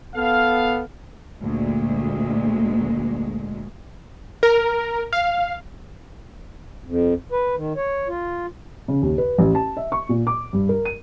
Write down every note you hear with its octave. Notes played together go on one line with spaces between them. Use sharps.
B3 A4 F5
D2 A#2 G#3
A#4
F5
F2
B4
D#3
C#5
F4
C#3
D#2
B4
A1
A5
E5
C#6
A#2
D6
G2
A#4
D#7